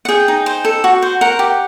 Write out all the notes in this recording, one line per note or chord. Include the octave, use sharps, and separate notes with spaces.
F#5
G#4 G5
D#4
C5
A4
F#4
C5
A#4 F#5
G4